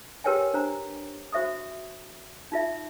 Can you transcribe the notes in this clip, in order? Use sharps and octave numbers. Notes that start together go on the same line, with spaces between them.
G4 A#4 B4 C#5 G5 G#5
D4 C5 A#5
F#4 C5 E5 C#6 D#6
D#4 F4 E5